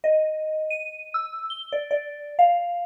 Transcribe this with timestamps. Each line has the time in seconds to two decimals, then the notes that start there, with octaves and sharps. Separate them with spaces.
0.04 D#5
0.70 D#7
1.14 E6
1.50 G7
1.72 D5
1.91 D5
2.39 F5